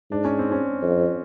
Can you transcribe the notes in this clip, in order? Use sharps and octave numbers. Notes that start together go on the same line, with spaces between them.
G#2 D4
C#4
C4
C#4
F2